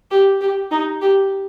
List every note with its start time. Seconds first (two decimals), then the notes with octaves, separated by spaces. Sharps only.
0.11 G4
0.41 G4
0.71 D#4
1.01 G4